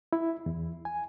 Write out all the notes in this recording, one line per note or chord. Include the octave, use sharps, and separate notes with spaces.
E4
E2
G#5